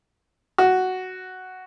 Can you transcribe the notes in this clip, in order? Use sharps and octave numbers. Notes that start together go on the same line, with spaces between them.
F#4